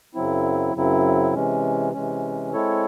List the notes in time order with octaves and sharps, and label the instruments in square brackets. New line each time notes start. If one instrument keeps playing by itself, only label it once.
[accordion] F#2 C#3 F#3 C4 E4
F#2 C#3 F#3 C4 E4
C3 E3 G#3 C#4
C3 E3 G#3 C#4
G#3 C4 E4 A4 C#5